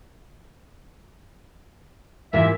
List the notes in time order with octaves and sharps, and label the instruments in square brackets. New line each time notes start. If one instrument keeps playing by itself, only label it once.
[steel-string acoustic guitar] G#2 C3 E3 [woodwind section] A#3 F4 E5